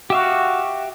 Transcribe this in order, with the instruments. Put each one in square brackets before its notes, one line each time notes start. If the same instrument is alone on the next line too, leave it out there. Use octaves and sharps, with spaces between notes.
[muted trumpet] F#4 [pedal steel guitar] G4 E5 F5